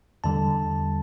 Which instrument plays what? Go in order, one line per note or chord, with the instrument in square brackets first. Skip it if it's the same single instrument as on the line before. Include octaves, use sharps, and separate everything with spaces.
[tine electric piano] E2 D3 G3 A5